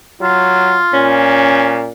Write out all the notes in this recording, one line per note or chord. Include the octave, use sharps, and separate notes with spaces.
F#3 F4
A#2 C#4